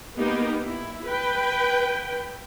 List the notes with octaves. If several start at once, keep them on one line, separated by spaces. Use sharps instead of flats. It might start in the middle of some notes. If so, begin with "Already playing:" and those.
A#3 B3 D#4 G4
E4
B4 G5